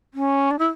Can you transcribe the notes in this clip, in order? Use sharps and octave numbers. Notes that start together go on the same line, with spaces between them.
C#4
D4
E4